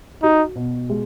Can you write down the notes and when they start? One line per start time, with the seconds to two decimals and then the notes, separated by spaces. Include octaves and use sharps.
0.23 D#4 F#4
0.56 B2
0.90 G#3